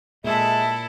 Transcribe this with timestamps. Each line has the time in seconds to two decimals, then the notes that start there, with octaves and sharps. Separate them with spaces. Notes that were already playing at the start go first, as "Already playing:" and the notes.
0.24 A#2 G#3 E4 A4 E5